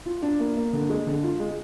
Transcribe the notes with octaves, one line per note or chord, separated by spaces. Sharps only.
F4
D4
A#3
A#3
D3
G#3
D3
F4
G#3